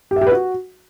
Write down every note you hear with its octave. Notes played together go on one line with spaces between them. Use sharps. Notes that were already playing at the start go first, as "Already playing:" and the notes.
G4
E5
G4
B4
F#4